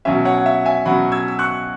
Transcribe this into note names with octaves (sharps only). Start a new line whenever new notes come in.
B2 F#3 C#4 E5
C#5 F#5
F#5
E5
E5 G#5
B2 F#3 C#4 F#5 B5
E6 G#6
E6
C#6 F#6